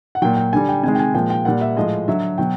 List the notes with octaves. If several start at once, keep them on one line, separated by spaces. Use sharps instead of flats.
F#5
A#2 F#3 G5
G5
D3 G3 G#5
G5
C3 D#3 G#3 G#5
G5
G#5
A#2 F3 G#3 G5
G5
A#2 G3 F#5
E5
A2 F3 G#3 D#5
D3 F#3 E5
B2 F#3 G5